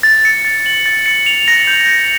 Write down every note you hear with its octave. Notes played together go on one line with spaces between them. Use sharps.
A6
C#7
A6
F#7
A6
C#7
F7
A#6
G6
C#7